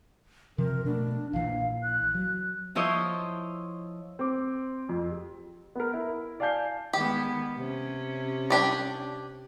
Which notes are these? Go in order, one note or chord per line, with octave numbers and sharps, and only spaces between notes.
C3 F3 A#4
B2 A3 D4
A#1 A#2 E3 F5
F#6
F#3
F3 E4 F4 C5 C#5 D#5
C4 D6
F2
G4
B3 A#4
E4
D5 F5 G#5 A5 G6 C7
D#3 G#3 B3 G4
C3 C#4
D4 G4 D5